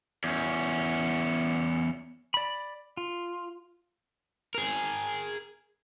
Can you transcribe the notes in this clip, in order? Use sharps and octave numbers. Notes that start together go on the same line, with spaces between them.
E2 C#4
D5 B5
F4
G#4 A#4